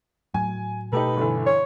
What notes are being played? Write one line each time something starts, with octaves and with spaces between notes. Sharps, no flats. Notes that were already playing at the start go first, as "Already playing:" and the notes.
A2 F#3 G#5
B2 A3 D#4 G4 A4 B4
G1 D3 E3
C#5